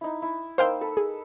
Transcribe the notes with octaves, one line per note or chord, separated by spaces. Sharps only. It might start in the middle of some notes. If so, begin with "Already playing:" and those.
D#4 E4
E4
A#3 D#4 C5 F5 G5 E6
A4 B4
G#4